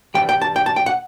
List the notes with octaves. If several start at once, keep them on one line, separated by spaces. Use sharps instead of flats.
G2 E3 G3 G5
G5
A5
G5
A5
G5
F#5